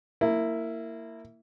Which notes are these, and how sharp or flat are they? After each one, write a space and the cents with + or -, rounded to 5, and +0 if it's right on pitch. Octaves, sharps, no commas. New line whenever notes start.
A#3 -20 E4 +0